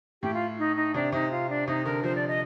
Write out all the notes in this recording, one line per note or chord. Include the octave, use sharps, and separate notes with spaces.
A2 G4
F4
D#4
D#4
C3 D4
C3 D#4
F4
D4
C3 D#4
D3 A#4
F3 C5
D5
D#5